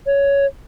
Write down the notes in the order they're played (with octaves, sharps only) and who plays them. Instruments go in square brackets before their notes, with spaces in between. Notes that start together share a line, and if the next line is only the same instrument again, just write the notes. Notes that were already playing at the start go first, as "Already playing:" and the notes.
[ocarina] C#5